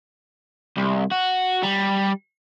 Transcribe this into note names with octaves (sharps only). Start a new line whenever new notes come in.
C2
F#4
G3